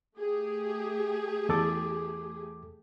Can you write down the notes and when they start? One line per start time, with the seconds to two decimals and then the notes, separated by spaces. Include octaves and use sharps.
0.18 A3 G4 G#4
1.49 E2 A4 D6